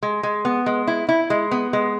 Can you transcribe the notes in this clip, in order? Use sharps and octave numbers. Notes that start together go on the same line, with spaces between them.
G#3
G#3
B3
G#3
E4
E4
G#3
B3
G#3